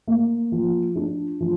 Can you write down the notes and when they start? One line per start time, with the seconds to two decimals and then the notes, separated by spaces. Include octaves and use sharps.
0.07 A#3
0.52 F3
0.96 D4
1.40 F3